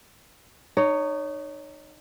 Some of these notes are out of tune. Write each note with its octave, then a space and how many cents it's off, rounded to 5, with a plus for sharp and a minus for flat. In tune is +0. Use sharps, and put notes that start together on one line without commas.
D#4 -25 C#5 +10